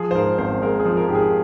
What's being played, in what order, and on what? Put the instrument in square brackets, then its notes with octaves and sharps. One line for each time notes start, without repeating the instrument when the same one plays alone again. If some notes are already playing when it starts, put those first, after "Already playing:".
Already playing: [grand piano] F3 G#4
C5
G#2 A#4
G#1 C5
G#3 A#4
G#4
F3
A#4
G#2 G4
G#4